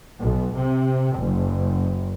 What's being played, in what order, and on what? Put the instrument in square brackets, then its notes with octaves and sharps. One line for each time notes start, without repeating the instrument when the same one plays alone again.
[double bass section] B1
C3
F#1